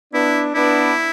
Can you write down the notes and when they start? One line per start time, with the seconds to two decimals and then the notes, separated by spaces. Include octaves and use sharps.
0.14 B3 D4 E4
0.55 B3 D4 E4